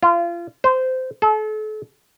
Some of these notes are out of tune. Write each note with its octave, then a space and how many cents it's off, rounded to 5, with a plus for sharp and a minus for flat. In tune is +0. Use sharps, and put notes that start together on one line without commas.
F4 -30
C5 -20
A4 -40